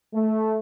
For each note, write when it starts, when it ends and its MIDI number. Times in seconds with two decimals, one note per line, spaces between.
0.14 0.59 57